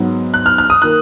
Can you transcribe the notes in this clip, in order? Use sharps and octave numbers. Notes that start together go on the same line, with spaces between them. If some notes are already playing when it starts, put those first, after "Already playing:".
Already playing: G#2 F#3 B3
F#6
F6
F6
D#6
D#3 A#3 F#6